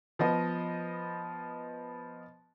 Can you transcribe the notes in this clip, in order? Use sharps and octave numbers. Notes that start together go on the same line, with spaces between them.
F3 B3 D#5